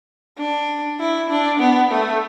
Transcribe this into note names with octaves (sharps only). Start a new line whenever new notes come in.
D4
E4
D4
B3
A3